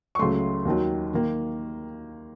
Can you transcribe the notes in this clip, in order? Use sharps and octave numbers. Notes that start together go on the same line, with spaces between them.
C#6
C#2 C#3 F#3 A3 C6
D#2 D#3 F#3
D#3 A#3